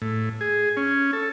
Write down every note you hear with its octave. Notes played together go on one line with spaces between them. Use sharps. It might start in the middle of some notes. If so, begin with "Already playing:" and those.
A2
G#4
C#4
A4